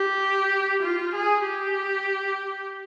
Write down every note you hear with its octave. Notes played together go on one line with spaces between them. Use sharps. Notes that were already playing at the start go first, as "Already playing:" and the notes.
Already playing: G4
F4
G#4
G4